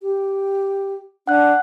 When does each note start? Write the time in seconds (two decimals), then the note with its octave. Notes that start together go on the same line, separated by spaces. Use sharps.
0.02 G4
1.27 D4 F#5 F#6